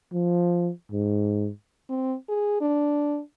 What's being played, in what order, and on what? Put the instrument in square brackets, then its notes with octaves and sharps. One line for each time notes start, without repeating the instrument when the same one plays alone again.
[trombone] F3
G#2
[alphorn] C4
G#4
D4